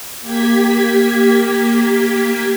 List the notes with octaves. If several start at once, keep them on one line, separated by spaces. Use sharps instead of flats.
A#3 G4 G#6 B6